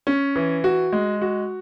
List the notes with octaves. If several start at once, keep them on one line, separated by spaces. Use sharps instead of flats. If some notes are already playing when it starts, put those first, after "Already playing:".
C#4
E3
F#4
G#3
F#4